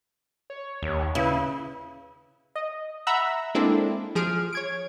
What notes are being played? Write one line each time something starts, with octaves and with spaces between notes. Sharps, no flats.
C#5
D#2
C#3 E4 B4
D#5
E5 F#5 A#5 B5 E6
G#3 A#3 C4 D4 E4 A4
F3 G#4 F6 D7
C#5 G#6 D7